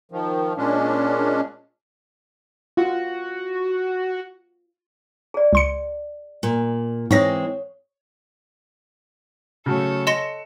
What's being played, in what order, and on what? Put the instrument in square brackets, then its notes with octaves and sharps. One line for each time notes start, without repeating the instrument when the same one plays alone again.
[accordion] D#3 F3
A#2 G#3 C#4 D4
[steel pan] F4 [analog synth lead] F#4
[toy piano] G#4 D5
[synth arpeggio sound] C#2 C6 C#7
[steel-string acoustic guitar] A#2
[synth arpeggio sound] G#2 A#6 [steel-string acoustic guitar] E3 G#3 C4 [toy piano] G4 C#5 D#6
[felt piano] C#3 F#3 A3 [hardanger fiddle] A4 C#5
[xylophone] D#5 C6 A#6 [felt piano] C#7 E7